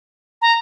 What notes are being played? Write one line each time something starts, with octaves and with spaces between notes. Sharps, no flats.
A#5